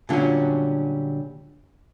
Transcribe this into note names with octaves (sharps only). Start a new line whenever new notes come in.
A#2 D3 F#3 G3 C#4